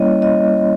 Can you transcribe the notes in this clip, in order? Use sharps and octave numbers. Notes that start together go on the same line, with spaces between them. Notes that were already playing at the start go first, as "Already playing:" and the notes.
Already playing: G3 A#3 C#4 E4 C#5 D#5
D#5